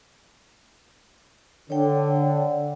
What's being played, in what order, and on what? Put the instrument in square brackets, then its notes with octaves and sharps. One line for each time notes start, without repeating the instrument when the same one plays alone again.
[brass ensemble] D3 [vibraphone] C#5 G5